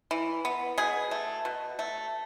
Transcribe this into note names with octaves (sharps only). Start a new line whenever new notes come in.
E3
B3
B2 G#4
A3
B2
A3